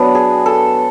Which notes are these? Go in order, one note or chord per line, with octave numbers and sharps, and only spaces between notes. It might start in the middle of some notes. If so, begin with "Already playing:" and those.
Already playing: F#3 B3 D4
G#4
A4